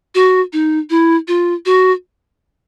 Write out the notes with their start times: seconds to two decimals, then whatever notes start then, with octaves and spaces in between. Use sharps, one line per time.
0.15 F#4
0.53 D#4
0.90 E4
1.28 F4
1.66 F#4